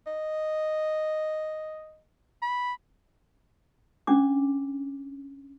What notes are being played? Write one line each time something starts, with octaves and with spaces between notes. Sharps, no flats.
D#5
B5
C#4 D4 D6